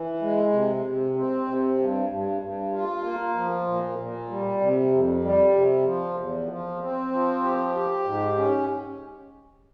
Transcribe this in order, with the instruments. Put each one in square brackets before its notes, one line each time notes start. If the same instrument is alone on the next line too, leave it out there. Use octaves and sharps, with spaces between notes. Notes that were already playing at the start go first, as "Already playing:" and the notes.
Already playing: [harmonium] E3
G#3
C3
C3
C4
C3
G2
G2
G2
F4
A#3
F3
A#2
A#2
G3
C3
F2
G3
C3
F3
E2
F3
C4
F3
G4
G4
G#2
C#4